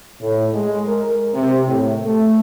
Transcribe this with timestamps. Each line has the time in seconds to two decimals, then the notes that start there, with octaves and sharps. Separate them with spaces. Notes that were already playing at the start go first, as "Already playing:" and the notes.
0.21 A2
0.53 G#3
0.87 A#4
1.34 C3
1.67 A2
2.05 A3